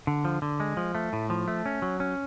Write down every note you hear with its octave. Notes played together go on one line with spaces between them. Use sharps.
D3
F3
D3
G#3
F3
A3
A2
F3
A3
C#4
F#3
C#4